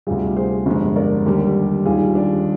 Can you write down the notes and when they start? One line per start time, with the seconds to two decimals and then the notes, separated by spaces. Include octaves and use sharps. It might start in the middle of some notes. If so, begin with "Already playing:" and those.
0.07 D2 C3 G3 F4 G#4
0.36 G#4 C5
0.66 G1 F2 D3 G#3
0.96 A#4 D5
1.26 D#2 D3 G3 G4 A#4
1.85 D#2 D#3 G3 F4 G#4
2.15 D4